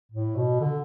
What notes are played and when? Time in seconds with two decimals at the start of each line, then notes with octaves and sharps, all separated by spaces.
0.12 A2
0.36 B2
0.60 D3